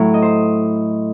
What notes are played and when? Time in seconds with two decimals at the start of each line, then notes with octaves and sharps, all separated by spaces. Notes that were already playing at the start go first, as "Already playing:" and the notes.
Already playing: A2 F#3 E4
0.14 D#5
0.22 C5